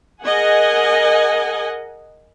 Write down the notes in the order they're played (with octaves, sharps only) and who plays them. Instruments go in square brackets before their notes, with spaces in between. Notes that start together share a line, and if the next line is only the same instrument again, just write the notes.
[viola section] G#4 A#4 D#5 F#5 G#5